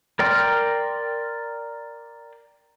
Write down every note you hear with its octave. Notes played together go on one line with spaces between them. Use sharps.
A#4 D5 G5 C6 F6